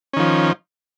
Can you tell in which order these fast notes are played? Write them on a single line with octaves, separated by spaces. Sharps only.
C#4 D#3 F3